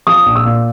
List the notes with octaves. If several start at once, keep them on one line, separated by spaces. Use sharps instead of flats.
F3 D#6
A#1
E6
A#2